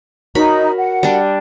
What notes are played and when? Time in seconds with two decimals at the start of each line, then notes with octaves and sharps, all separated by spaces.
0.35 D#4 F#4 A#4 C#5 A#5 B5
0.77 F#5
1.03 G3 D4